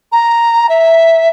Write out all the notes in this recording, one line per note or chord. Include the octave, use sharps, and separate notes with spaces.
A#5
E5